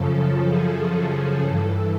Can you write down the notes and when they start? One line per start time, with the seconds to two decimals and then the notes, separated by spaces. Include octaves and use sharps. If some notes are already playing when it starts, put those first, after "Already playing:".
Already playing: F#2 C#3 F3 A4
0.43 G#4
0.93 A4
1.41 G2 E3